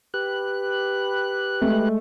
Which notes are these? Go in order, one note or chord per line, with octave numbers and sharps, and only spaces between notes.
G4 B4 F#6
G#3 A3